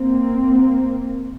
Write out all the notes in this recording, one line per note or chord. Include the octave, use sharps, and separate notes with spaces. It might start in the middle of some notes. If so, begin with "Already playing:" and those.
Already playing: A#3 C4